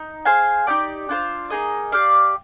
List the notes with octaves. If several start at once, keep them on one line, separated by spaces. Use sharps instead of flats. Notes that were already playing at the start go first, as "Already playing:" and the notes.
Already playing: D#4
G#4 C5 F5 G#5
D#4 G4 D5
D4 F4 C5
A#3 D#4 G#4 D#5
G4 D5 F5